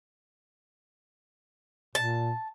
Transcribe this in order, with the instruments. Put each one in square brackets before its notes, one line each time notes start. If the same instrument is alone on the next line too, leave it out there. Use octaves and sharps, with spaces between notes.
[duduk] A#2 [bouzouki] A5